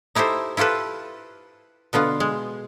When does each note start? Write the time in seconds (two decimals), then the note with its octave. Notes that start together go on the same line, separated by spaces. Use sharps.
0.15 D#4 E4 G4 A4 C5
0.57 E4 F4 G4 A4 B4
1.93 B2 D3 B3 F4
2.20 G#3